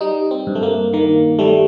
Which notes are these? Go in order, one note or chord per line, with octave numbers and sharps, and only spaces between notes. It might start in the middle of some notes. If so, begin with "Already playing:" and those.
G3 D#4
C4
G2
A3
A#3
D#3 A#3
G3 A3